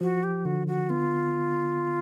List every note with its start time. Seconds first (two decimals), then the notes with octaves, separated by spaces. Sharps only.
0.01 F3 F#4
0.23 G4
0.45 D3 F#4
0.67 F#4
0.89 B3 F4